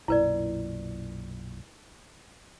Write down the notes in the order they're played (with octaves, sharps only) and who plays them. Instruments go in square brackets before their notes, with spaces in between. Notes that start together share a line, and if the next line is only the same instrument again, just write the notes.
[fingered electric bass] B1 F#2 A#2 [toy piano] E4 B4 D5